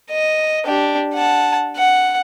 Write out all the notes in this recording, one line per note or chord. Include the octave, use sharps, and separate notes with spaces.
D#5
D4 G4
F#5 A5
F#5